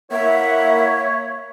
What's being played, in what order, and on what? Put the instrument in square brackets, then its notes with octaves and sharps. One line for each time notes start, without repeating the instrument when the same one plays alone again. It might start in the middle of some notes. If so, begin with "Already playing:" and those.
[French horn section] A#3 [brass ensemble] E4 F#5 [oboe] C#5 [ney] E5